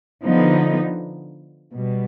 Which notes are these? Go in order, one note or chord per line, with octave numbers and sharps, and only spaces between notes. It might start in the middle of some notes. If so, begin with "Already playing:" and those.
D3 F3 B3 D#4
B2 G3